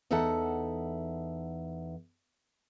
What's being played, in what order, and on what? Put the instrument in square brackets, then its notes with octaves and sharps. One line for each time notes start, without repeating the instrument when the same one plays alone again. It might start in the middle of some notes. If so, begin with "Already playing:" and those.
[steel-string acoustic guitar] E2 D#4 A4 E5 F#5 A5